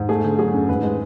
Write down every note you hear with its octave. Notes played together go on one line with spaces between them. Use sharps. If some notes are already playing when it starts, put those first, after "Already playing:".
Already playing: G#2
A3 G#4
D3
F#3 G#4
F#2
G#2 B4
G#3